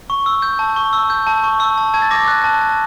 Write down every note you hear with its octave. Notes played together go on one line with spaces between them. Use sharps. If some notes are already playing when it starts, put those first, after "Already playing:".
C#6
E6
G6
A5
C#6
E6
G6
A5
C#6
E6
A5
A5 G#6
A6
D6 A#6
F#6
A5
A5